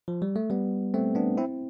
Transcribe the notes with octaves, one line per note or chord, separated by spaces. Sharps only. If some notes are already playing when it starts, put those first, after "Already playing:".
F3
G3
A3
G3 B3
A3 C4
B3 D4
C4 E4